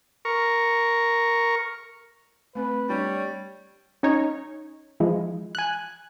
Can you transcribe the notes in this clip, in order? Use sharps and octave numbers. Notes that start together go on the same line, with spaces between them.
A#4 C#6
A3 C4 B4
G3 D4 G4 C#5
C#4 D#4 C#5
E3 F3 G#3
G#5 F#6